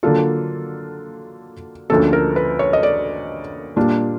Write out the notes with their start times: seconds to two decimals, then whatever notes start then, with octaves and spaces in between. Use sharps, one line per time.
0.03 D3 F#3 A#3 D4 F4 A4
1.90 D2 D3 F3 A#3 C#4 A4
2.13 A#4
2.36 B4
2.59 C#5
2.73 D#5
2.83 D5
3.76 A#2 G3 A#3 D4 F4